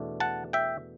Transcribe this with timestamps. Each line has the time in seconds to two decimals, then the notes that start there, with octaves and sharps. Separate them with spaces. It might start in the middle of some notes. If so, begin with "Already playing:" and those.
Already playing: E2 B2 A3 D4
0.20 F#5 A5
0.53 E5 G5